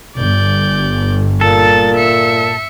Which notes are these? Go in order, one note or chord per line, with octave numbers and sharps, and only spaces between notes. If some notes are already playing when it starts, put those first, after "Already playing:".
G1 D5 G6
A#2 A4 A6
E5 C#7